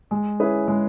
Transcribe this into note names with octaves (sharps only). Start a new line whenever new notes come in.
G#3
C#4 E4 G#4 B4
G#3